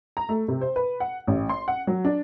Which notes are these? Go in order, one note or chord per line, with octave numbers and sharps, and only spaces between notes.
A#5
A3
C3
C5
B4
F#5
A1
C6
F#5
F#3
D4